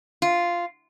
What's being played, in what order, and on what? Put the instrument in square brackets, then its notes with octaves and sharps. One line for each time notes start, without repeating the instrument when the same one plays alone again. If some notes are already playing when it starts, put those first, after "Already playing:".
[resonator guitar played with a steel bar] F4